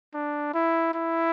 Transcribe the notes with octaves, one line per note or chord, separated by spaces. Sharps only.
D4
E4
E4